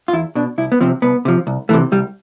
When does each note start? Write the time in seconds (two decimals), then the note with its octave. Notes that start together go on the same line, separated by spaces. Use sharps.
0.08 F4
0.13 E2 E4
0.35 B2 D4
0.58 C2 E4
0.72 B3
0.81 C3 F3 C4
1.02 C2 B3
1.25 C3 F3
1.47 C2
1.69 C3 E3 A3
1.92 C2 G3